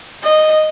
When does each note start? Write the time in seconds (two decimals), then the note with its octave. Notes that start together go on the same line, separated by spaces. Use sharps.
0.23 D#5